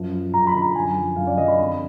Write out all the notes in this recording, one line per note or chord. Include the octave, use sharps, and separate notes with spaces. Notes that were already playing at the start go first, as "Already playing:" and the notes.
Already playing: F#2 F3
F3
F#2 A#5
B5
D3
A#5
F#2 G#5
F3
F#2 F5
D5
D3 D#5
B5
F2 B5